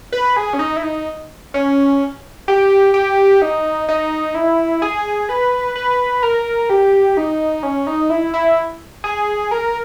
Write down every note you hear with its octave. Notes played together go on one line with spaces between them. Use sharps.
B4
G#4
C#4
D#4
E4
D#4
C#4
G4
G4
D#4
D#4
E4
G#4
B4
B4
A#4
G4
D#4
C#4
D#4
E4
E4
G#4
A#4